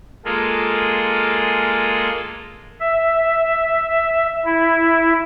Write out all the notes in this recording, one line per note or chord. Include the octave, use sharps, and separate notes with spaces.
G#3 A#3 F4 G#4 A4
E5
E4